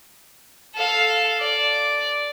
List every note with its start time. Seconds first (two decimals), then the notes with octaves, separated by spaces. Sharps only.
0.75 A4 F5
1.40 D5